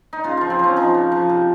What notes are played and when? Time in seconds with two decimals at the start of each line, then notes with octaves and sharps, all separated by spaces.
0.13 D#4
0.24 C#3 F4
0.37 F3 F4
0.50 C4
0.59 F3 C#4
0.76 F3 D#4
0.94 C#3
1.12 F3
1.29 C3